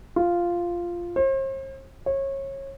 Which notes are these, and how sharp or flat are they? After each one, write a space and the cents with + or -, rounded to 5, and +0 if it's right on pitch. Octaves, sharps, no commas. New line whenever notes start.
F4 -5
C5 +45
C#5 -25